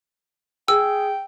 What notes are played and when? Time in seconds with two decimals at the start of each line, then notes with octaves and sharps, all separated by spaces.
0.68 G#4 G5 E6